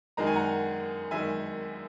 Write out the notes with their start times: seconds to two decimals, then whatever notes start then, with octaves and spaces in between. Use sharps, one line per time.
0.17 F#2 D#3 G#3 A#5
0.27 G#5
0.36 F#5 A#5
1.11 F#2 D#3 G#3 E5 G#5